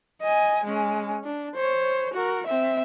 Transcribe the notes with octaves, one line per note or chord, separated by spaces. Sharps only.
D#5 G#5
G#3 C#4
D4
C5 C#5
F#4 A#4
C4 E5